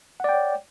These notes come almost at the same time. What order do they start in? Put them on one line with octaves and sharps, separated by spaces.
F#5 D5 G5 C#5